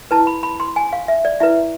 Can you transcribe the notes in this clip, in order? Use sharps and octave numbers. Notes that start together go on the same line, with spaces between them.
E4 B4 A5
B5
B5
C6
G#5
F5
E5
D5
E4 B4 E5